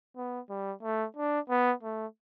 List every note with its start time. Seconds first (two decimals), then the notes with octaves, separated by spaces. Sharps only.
0.17 B3
0.50 G3
0.83 A3
1.16 D4
1.50 B3
1.83 A3